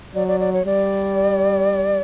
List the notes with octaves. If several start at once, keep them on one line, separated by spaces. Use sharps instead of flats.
F#3 D5
D5
D5
C#5
G3 D5